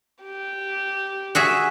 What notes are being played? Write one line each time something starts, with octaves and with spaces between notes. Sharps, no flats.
G4
F#4 G#4 E5